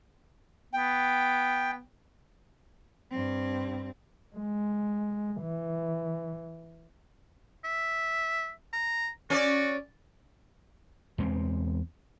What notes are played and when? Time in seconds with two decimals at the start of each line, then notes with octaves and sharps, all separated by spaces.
0.73 B3 G5
3.11 G2 C4
4.36 G#3
5.41 E3
7.64 E5
8.73 A#5
9.30 C#4 F#4 D5
11.18 E2 G#3 B3 C4